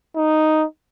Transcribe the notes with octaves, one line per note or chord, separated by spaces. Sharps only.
D#4